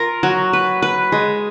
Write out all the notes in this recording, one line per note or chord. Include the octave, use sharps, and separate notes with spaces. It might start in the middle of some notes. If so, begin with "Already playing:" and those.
Already playing: F4 A#4
F#3
B4
B4
G#3